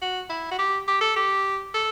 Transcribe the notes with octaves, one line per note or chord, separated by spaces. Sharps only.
F#4
E4
F#4
G4
G4
A4
G4
A4